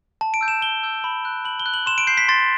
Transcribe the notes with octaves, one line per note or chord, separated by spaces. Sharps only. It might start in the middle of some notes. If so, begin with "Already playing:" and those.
A5
D7
E6 G6
E7
A5 G7
E6 G6
B5
F#6
B5 F#7
G7
F#6
F#7
C6 E7
D7
G6 C7
B6
C6 A6